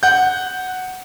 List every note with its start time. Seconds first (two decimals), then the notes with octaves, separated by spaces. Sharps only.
0.03 F#5 G6